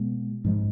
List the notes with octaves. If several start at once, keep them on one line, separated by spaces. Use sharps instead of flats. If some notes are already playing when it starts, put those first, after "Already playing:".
Already playing: B2 G#3 B3
G#2 F3 G#3